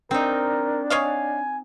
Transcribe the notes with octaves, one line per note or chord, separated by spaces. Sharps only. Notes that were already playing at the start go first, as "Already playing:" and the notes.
C4 D4 D#4 A#4
C#5 D#5 F5 G#5